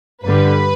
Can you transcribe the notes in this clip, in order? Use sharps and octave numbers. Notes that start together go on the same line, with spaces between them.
G2 D3 G3 B4